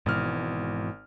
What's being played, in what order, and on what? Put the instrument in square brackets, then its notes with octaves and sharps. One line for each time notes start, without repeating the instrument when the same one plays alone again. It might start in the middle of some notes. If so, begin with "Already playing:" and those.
[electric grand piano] G#1 F6 [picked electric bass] G#2 B2 E3